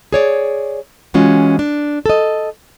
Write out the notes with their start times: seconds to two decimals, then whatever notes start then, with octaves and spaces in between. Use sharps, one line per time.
0.12 G#4 C#5 D5
1.14 E3 G#3 C#4 F4 F#4
1.59 D4
2.06 A4 D#5